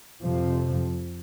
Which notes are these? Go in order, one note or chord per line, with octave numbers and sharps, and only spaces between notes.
F2 C3 F3